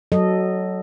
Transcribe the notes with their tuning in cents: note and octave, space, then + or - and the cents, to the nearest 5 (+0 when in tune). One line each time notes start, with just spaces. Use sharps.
F#3 +10 A4 +0 D#5 -10